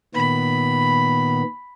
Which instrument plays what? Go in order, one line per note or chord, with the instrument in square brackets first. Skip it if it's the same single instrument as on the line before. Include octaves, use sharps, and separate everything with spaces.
[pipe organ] A#2 D#3 B3 [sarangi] B5